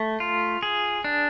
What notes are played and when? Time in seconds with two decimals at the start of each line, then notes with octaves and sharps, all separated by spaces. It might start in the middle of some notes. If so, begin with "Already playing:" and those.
Already playing: A3
0.20 F4
0.63 G#4
1.04 D4